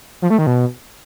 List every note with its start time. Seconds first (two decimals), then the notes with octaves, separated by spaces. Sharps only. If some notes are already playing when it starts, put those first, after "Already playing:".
0.22 F3
0.30 A3
0.39 D#3
0.47 B2